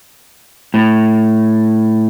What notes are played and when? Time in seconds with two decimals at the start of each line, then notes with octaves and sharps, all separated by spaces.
0.74 A2